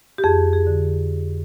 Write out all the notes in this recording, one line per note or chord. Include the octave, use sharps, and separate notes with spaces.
G4
F2 G#4
G#4
D3